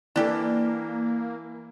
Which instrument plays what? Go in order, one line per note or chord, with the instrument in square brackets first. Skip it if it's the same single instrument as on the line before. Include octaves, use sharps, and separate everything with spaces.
[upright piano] E3 [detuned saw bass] A#3 [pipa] D4 G4 A4